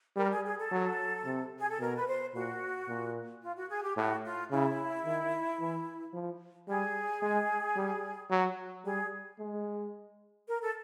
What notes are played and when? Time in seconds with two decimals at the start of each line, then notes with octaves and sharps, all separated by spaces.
0.16 G3 A#4
0.30 G#4
0.43 G#4
0.58 A4
0.71 F#3
1.25 C3
1.59 G#4
1.70 A4
1.79 B2 A#4
1.96 B4
2.07 C5
2.34 A#2 F#4
2.88 A#2
3.43 F4
3.56 F#4
3.69 G#4
3.82 G4
3.97 A2 F#4
4.24 F4
4.51 C#3 E4
5.05 D#3
5.60 E3
6.14 F3
6.68 G3 G#4
7.22 G#3
7.76 G3
8.31 F#3
8.85 G3 G#4
9.39 G#3
10.47 A#4
10.61 A4